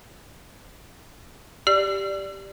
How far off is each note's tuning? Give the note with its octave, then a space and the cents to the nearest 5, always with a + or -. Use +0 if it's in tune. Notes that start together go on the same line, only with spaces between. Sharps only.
G4 +0 D5 +0